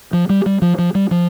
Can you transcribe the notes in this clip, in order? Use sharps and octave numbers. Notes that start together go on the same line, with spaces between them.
F3
G3
G3
F3
F3
G3
F3